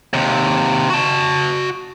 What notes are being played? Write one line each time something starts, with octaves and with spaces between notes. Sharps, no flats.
D#2 C3
F#4 A5